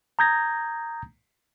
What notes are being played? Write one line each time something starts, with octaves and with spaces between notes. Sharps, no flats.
A#5 D#6 G6 G#6 A#6